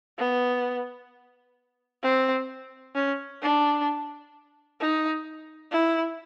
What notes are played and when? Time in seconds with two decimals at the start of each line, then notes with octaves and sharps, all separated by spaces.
0.18 B3
2.03 C4
2.95 C#4
3.42 D4
4.80 D#4
5.72 E4